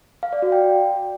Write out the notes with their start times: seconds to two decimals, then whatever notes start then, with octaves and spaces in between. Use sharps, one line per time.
0.23 F5
0.33 D5
0.42 F#4
0.52 G5